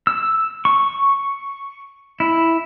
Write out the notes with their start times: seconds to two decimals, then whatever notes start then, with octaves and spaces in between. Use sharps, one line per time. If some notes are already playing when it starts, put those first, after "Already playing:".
0.07 E6
0.65 C#6
2.20 E4